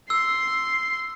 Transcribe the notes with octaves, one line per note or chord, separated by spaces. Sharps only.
C6 E6